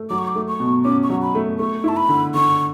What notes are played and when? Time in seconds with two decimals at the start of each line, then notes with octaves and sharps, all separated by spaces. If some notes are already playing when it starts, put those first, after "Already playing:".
Already playing: A3
0.10 F#3 D6
0.18 C#6
0.27 D6
0.35 A3
0.48 C#6
0.60 B2
0.85 C#4 D6
1.03 C#6
1.10 F#3
1.22 B5
1.35 A3
1.59 A3 C#6
1.84 E4 A5
1.97 B5
2.09 D3
2.34 D3 C#6